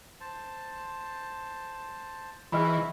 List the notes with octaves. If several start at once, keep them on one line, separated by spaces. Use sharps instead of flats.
C5 A5
E3 C4 E4 F#4 G#4 D#5 B5 F6